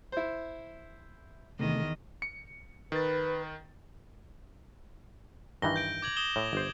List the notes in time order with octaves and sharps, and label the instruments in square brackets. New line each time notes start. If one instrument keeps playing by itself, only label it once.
[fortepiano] E4 C5
[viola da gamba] E2 D#3 D#5 [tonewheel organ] C3 A3
[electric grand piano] C#7
[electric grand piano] D#3 A6 [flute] B4
[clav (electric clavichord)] G2 D#3 E3 [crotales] A#6 G7
[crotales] G6 D7
D6 G#6 F#7
D#6 E7 G7
[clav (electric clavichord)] A2
G1 C5